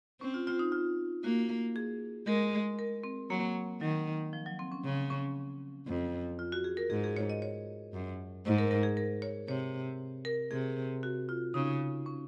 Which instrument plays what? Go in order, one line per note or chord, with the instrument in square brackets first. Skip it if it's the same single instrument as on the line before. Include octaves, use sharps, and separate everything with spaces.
[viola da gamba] C4 [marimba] C#4
[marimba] F4
F4
D#4
F4
[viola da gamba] A#3 [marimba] F#4
[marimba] G#4
[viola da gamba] G#3 [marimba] A#4
[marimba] A#4
C4
[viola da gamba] F#3 [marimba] A#3
[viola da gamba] D#3 [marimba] F#3
[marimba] F3
F#3
C4
C#4
[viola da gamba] C#3
[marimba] C#4
[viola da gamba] F2
[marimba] F4
F#4
G#4
A#4
[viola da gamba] G#2 [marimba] G#4
[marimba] G#4
C#5
D#5
C#5
[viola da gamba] F#2
[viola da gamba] G#2 [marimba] C5
[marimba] A#4
A#4
G#4
A#4
C#5
[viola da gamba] C3 [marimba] C#5
[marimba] A#4
[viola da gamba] C3 [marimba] G#4
[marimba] F#4
F4
[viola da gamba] C#3 [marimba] D#4
[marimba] C#4